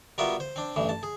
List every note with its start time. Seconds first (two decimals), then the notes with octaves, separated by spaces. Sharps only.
0.18 G3 B3 F4 F#4 A#4 E5
0.40 C5
0.56 C4 D4
0.76 A1 G2 E3
0.89 A5
1.03 G#4